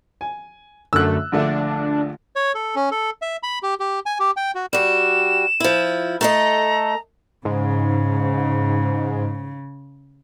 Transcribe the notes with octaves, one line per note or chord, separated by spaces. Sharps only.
G#5
F#2 D3 A3 E6 F#6
A#1 D3 A3 D4
C#5
A4
C#4
A4
E5
B5
G4
G4
G#5
G4
G5
F#4
G3 F#4 E7
F3 E4
A3 A4 D#5 A#5
G#2 C#3